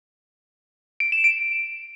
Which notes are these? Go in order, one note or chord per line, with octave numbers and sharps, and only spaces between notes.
D7
E7
D7